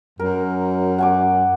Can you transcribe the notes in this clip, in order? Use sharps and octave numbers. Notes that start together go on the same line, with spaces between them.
F#2 A#4
F#5 G#5 D6